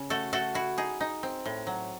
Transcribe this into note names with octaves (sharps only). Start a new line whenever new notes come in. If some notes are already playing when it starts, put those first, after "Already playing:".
Already playing: C#3
A3 F#4 A4
A3 F#4 A4
E4 F#4
D#4 G#4
D#4
C4
A2
F#3